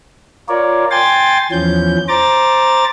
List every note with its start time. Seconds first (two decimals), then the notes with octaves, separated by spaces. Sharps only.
0.49 F4 A#4 C#5 D5
0.91 G5 G#5 C6 A6
1.52 E2 E3 F3 C#4 G6
2.08 C5 A#5 D6 A6